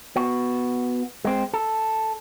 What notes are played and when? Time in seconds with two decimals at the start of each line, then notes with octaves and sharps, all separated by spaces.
0.16 B3 F#4
1.25 G#3 C4
1.54 A4